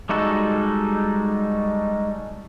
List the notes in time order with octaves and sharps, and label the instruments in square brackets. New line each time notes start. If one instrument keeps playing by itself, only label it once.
[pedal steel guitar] G3 G#3 D#4 F#4 A4